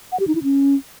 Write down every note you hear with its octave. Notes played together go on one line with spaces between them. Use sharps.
F#5
G4
D#4
E4
C#4